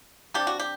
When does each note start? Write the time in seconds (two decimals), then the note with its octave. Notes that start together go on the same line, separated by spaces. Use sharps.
0.34 C3 G3 D4 G4
0.47 F#4
0.60 G4